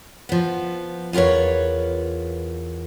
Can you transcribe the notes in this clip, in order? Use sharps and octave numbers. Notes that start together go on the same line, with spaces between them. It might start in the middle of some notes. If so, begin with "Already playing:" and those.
F3 B3
E2 F4 A#4 B4 C#5